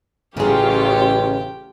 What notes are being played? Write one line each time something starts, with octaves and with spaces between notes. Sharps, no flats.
A1 C#3 F#3 F4 G4 G#4 C#5 G5